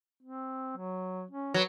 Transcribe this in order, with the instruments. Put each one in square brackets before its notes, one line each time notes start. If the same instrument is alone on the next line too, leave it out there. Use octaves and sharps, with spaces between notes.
[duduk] C4
F#3
C#4
[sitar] F#3 [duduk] B4